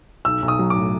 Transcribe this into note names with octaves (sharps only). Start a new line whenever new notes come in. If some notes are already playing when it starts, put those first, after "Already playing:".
B1 E6
B1
D#6
F#3
D6
A2